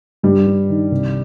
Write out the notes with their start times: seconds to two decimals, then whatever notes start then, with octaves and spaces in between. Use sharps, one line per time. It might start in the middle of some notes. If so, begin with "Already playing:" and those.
0.23 G2 G3
0.47 G2
0.69 D#3
0.91 C2